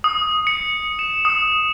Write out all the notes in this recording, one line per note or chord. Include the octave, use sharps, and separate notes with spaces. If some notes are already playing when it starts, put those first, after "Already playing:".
D#6
C#7
E7
D#6